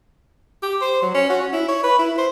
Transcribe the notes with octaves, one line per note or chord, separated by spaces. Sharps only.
G4
C5
F#3
C#4
F#4
C#4
E4
C#5
B4
E4
C5